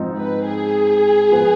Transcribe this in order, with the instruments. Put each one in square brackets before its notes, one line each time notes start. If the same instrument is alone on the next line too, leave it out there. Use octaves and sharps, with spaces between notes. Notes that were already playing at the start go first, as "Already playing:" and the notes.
Already playing: [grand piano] G#2 F3 C4 D#4
[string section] B4
G#4
[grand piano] F3 B3